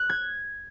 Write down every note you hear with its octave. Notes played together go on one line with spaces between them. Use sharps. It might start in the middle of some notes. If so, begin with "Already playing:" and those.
Already playing: F#6
G#6